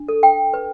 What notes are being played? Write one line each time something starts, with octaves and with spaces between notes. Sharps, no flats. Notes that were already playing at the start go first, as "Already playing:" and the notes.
Already playing: D4
A4
G5
B4